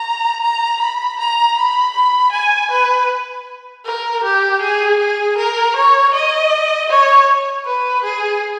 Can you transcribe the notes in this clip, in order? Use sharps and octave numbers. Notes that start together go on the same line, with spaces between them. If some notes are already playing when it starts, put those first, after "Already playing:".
Already playing: A#5
A#5
B5
A#5
B5
B5
G#5
B4
A#4
G4
G#4
G#4
A#4
C#5
D#5
C#5
B4
G#4